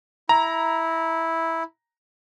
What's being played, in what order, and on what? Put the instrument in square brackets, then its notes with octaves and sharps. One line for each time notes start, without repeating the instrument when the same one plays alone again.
[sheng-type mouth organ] E4 [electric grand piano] A#5